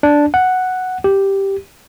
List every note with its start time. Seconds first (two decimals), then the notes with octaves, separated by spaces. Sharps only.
0.03 D4
0.34 F#5
1.04 G4